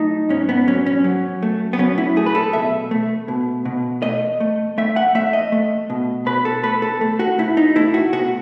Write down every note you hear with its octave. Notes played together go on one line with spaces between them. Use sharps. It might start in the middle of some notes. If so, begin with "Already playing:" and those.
Already playing: F#3 A3 D#4
G#2 C#4
B3
F#3 C#4
C#4
F#3
A3
B3
F#3 C#4
E4
A3 G#4
B4
A4
B2 E5
A3
B2
B2
A3 D#5
A3
A3 E5
F#5
A3 E5
D#5
A3
B2
B2 B4
A4
A3 B4
A4
A3
F#4
A3 E4
D#4
A3 E4
F#4
B2 F#4